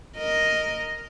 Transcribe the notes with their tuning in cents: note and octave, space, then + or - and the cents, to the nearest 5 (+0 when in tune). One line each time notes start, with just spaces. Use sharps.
A#4 +0 D#5 +0